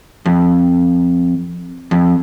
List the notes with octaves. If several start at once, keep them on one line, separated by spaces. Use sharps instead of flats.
F2
F2